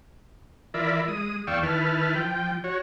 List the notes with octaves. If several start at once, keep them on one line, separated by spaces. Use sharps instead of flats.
E3 F4 A#4 D5 E5 B5
G#3 D#6
E2 D5 F5 G5 C#6 E6
D#3 E4 B4 A5 F6
F3 G5
F#4 C#5